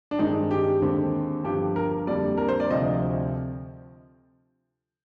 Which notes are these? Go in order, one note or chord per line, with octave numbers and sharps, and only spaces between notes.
D4
G2 D#3 G#3 C4 D#4
G4
D#2 D3 G#3 C4
G1 G2 F3 G4
A#4
F2 D3 G3 A#3 D5
A#4
C5
D5
D2 C3 F3 C4 D#5